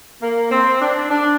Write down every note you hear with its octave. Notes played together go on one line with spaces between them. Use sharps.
A#3
C4
D4
D4